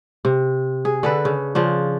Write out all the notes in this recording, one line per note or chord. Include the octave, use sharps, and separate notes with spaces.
C3
G#4
D3 A4 B4
C#3
C#3 F3 D4